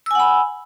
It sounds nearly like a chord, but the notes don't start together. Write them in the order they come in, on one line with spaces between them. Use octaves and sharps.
E6 G#5 F#5 B5